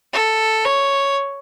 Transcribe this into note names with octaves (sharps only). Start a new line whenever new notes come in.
A4
C#5